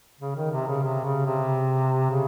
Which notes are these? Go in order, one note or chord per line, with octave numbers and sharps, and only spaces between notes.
C#3
D#3
C3
C#3
C3
C#3
C3
C#3